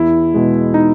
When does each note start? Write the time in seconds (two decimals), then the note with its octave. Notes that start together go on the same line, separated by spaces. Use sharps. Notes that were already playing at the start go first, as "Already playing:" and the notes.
Already playing: E2 E4
0.34 B2 G#3
0.74 D#4